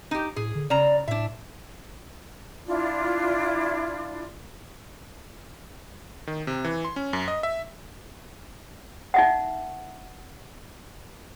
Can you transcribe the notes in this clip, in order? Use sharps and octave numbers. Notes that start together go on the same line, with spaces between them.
D#4 G4
A2 G#4
D3
C#3 D5 A#5
A2 D4 E5
D4 E4 F4 D5
D#3
C3
E3
C6
C#4
F#2
D#5
E5
D#4 E5 F#5